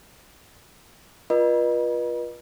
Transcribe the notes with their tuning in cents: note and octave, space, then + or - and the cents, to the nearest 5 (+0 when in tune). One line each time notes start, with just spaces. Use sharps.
F4 +0 B4 -40 D#5 -30